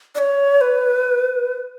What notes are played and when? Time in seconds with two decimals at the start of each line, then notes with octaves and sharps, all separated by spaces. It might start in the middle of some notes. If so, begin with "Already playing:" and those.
0.15 D5
0.19 C#5
0.61 B4